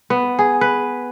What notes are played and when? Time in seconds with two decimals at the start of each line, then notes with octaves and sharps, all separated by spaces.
0.10 B3
0.39 G#4
0.61 B4